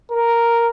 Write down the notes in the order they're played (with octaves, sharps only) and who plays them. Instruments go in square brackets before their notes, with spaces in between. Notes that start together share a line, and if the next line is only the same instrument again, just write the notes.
[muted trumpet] A#4